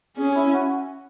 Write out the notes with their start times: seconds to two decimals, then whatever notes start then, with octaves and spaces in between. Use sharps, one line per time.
0.17 C#4 G#4
0.34 E4
0.52 F#4